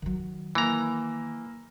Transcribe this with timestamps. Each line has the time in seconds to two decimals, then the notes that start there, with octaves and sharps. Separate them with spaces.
0.02 D#3 F#3
0.55 E3 A#3 A#5